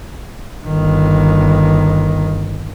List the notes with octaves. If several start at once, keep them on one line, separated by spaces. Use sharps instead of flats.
G1 D#3